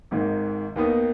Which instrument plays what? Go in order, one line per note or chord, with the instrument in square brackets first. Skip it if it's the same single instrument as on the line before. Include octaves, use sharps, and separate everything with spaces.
[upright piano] G#1 G#2 D#3
D#2 D#3 B3 D#4